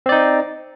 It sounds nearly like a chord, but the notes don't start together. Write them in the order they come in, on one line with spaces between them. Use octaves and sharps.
C4 D5 D#4